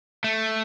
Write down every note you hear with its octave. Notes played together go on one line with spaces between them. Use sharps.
A3